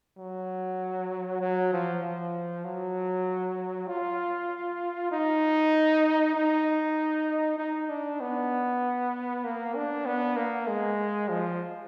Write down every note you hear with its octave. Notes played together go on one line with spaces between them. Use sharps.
F#3
F#3
F3
F3
F#3
F4
D#4
D#4
D#4
D4
B3
A#3
D4
B3
A#3
G#3
F3